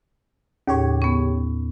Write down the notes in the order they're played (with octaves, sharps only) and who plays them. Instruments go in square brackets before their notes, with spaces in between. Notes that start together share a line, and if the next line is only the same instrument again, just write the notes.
[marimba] D#2 A2 [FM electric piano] C#3 G4 C#5
[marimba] B3 C#4